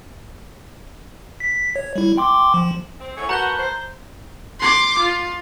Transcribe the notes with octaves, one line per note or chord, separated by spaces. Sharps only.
B6
C#5
G3 E4
G5 C6 D6
F3
C4
A2 B3 C#5 G#5 C#6
F#4 A#4 B4 A5 A#5 G6 G7
C5
C6 D6
F4